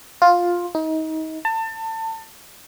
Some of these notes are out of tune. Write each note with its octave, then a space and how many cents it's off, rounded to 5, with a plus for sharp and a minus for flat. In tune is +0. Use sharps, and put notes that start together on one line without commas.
F4 +10
D#4 +30
A5 +30